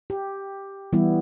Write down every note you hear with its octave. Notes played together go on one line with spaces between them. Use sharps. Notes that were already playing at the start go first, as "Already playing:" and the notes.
G4
E3 G3 B3 E4